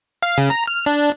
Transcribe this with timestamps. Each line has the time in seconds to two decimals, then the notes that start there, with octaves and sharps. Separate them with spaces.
0.22 F5
0.38 C#3
0.50 A#5
0.67 F6
0.86 D4